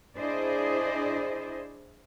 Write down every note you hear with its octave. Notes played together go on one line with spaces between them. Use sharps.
D4 E4 G#4 C5 D5 D#5